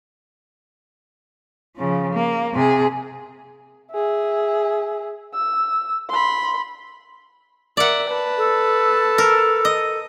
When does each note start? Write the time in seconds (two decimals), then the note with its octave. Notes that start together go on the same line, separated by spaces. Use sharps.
1.77 C#3 F3
2.13 A#3
2.54 C3 G#4
3.92 G#4 E5
5.34 E6
6.09 B5 C6
7.77 A#4 D5 E5 F#5
8.07 B4 A5
8.37 A4
9.18 A#4
9.65 D#5